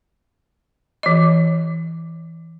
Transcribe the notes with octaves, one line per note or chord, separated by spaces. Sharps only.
E3 D#5